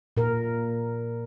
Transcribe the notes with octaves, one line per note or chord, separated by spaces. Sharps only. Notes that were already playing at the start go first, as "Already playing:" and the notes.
A#2 A#4